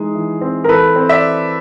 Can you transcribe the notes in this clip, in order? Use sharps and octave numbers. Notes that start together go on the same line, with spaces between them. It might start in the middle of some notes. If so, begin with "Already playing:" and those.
Already playing: E3 G#3 D#4 G#4
E3
C4
A#4
E3 A4 B4
C4
D5 E5